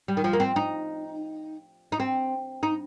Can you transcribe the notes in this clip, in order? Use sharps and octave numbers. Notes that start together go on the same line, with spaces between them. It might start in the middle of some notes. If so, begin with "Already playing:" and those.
G3
D#3
F3
A#3
C4
D#4
D#4
C4
D#4